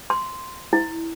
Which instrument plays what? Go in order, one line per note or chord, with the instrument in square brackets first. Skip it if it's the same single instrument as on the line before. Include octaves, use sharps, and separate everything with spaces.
[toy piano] C6
E4